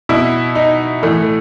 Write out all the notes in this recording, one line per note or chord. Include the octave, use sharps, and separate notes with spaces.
B2 E4
D#4
A2 E3 A3